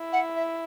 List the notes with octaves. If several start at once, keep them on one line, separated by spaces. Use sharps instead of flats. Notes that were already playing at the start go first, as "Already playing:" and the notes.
Already playing: E4
F#5
E5